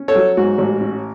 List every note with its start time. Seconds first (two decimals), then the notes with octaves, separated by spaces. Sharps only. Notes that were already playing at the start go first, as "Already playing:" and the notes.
Already playing: C#4
0.08 A4 C#5
0.15 F#3
0.37 G#2 F#4
0.58 A1
0.81 C#4